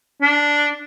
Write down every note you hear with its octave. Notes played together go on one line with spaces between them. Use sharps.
D4